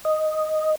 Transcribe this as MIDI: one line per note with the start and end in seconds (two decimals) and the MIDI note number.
0.05 0.75 75